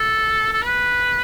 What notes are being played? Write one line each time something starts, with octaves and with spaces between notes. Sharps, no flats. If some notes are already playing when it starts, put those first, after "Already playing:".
Already playing: A4
A4
B4